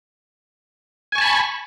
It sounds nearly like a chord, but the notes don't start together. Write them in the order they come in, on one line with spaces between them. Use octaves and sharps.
G#5 C#6 A5 B5